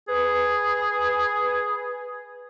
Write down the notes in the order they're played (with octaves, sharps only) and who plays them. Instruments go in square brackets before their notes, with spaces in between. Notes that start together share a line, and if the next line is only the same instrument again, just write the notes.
[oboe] G#4 [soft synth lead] B4